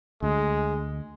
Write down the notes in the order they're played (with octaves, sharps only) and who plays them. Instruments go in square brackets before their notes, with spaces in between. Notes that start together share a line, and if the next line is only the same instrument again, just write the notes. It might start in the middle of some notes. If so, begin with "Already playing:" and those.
[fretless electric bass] D2 [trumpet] G#3